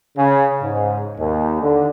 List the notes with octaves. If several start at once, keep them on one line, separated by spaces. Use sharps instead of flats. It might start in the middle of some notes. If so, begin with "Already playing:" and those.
C#3
G#2
D#2
D3